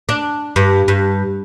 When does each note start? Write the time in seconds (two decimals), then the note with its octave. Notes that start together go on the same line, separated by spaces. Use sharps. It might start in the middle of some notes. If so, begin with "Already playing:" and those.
0.09 D4
0.56 G2
0.88 G2